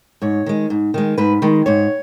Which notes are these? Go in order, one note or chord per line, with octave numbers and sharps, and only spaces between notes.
G#2 C#5
D#3 G#3
G#2
D#3 G#3
G#2 B4
D#3 G#3
G#2 C#5